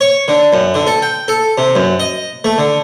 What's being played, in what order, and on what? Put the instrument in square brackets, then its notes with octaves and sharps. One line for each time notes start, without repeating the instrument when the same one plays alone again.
[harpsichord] C#5
D3
F#2
D3
A4
G5
A4
C3
F#2
D#5
A3
D3